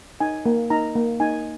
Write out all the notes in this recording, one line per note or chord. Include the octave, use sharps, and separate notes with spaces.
D#4 G#5
A#3
D#4 A#5
A#3
D#4 G#5